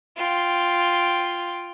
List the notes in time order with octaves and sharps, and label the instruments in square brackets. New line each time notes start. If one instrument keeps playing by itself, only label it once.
[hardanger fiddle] F4 G5